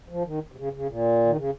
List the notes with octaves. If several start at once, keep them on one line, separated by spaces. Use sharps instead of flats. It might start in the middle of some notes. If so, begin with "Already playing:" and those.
F3
D#3
C3
C#3
C#3
A#2
D#3
C#3